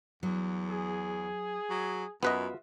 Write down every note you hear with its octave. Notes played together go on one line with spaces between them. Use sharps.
E2 F#3
G#4
F#3
F#2 B3 F4 F#4 B4 D#5 E5